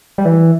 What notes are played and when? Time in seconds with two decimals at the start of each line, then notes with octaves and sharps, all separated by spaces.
0.18 G3
0.25 E3